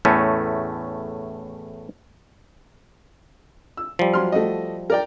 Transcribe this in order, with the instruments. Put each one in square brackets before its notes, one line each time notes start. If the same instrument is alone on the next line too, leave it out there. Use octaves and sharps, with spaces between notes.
[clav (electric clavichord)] E2 A2 A3 C#4
[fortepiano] E6
[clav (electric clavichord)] F3 G3
[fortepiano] F#3 C6 F6
A3 F#4 D#5
A#4 D5 G5